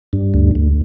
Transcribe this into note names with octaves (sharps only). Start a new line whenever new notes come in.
G2
D2
D2